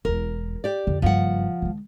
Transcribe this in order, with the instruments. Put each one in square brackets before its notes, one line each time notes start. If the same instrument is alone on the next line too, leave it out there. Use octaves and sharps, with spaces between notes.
[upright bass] E1 E2 [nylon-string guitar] A#4
[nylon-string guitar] G4 D5
[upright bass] F2 D3
[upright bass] F#1 G2 [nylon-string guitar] F3 F#5
[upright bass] D#3 G#3